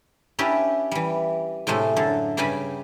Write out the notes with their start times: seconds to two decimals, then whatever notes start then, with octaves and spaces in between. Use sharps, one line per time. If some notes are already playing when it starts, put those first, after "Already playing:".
0.39 C#4 D4 E4 G4 B4
0.91 E3 G3
1.67 A2 C3 G#3 A3
1.96 F#2 D3 A4
2.37 G2 C#3 G3 G4 G#5 B5